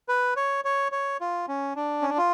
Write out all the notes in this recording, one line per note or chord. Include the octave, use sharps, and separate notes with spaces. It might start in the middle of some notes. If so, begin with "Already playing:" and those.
B4
C#5
C#5
C#5
F4
C#4
D4
C#4
D4
F4